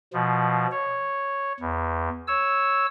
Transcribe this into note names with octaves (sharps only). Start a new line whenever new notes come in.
B2 F3
C#5
E2
C#5 E6